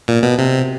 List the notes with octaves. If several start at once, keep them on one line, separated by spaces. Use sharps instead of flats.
A#2
B2
C3